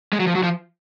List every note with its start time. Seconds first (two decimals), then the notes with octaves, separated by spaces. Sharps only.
0.13 G#3
0.20 F#3
0.27 F3
0.35 F#3
0.43 F3